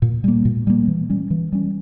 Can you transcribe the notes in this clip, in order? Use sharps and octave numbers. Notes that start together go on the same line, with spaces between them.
A#2
G3 A#3
A#2
G3 A#3
E3
G3 C#4
E3
G3 C#4